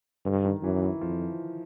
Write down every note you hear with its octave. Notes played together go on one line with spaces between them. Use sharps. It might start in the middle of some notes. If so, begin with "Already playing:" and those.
G2 D3
D#3
F#2 E3
E3
F2 F3